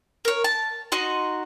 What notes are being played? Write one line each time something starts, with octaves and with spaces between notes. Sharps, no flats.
A#4 C#5
A5
D#4 F#4 D#5 C6